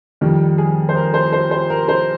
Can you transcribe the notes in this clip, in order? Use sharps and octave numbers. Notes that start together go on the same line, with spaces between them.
F2 D#3 G3
G#4
C5
A#4
C5
C5
C5
A#4
C5